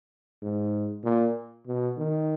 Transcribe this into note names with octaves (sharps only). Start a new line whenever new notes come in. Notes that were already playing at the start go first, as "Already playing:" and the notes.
G#2
A#2
B2
D#3